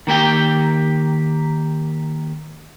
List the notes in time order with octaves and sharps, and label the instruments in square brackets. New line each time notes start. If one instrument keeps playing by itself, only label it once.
[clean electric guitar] D#3 A#3 G4 G5